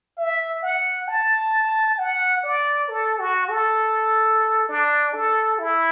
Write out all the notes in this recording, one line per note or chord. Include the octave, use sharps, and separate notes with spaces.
E5
F#5
A5
F#5
D5
A4
F#4
A4
D4
A4
E4